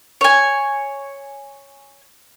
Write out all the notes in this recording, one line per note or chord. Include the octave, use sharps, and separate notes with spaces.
C#5 G#5